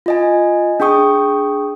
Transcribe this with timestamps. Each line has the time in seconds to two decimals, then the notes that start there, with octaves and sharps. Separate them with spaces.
0.06 F4 D#5 G#5
0.80 D4 G#4 G5 C#6 D#6